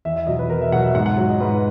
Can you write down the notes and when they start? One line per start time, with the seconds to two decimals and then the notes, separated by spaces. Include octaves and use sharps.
0.05 E2 E5
0.16 E5
0.27 B2 F#3 D#5
0.39 B4
0.50 E2 A#4
0.61 E5
0.72 B2 F#5
0.75 F#3
0.84 E5
0.95 G#2 F#5
1.06 F#5
1.17 F#3
1.29 D#5
1.40 G#2 B4